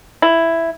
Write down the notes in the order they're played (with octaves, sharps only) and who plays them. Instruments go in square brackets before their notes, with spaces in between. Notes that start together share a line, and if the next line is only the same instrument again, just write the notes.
[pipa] E4